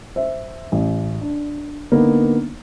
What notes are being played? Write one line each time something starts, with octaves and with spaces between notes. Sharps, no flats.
C5 E5
A1
D4
D3 A#3 B3 D#4